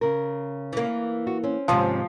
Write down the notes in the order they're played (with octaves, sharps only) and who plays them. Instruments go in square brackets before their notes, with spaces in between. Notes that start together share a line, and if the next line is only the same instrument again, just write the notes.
[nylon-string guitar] C#3 A#4
[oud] E3 A#3
[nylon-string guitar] F#4
C4 C#4
[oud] D#2 G#2 C3 [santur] F3